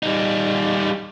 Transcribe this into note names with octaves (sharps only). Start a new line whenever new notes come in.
G3 D#4